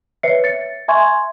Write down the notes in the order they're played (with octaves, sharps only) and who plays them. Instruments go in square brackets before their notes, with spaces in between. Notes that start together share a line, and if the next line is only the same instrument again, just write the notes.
[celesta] B4 C#5 E5 C7 C#7
A6 C#7
E5 G#5 C6 C#6 G#6